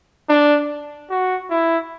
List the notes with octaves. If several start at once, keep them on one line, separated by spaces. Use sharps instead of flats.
D4
F#4
E4